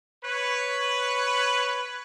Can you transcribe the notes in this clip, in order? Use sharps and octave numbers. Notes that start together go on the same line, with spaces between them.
B4 C#5